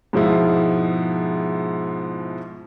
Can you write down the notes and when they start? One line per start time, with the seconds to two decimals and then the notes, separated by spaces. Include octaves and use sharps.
0.13 G#2 B2 F3 G#3 E4 F4